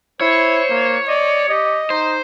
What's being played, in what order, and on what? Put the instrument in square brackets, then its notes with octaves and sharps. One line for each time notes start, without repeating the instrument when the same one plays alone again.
[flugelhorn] E4 [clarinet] C5 [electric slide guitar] C#5
[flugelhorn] A#3
[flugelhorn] D5 [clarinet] D#5
[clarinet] G4 [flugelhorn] D#5
[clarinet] D#4 [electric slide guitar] C5